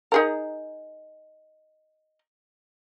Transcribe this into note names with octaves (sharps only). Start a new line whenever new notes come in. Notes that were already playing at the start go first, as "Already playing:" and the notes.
D#4 G#4 A#4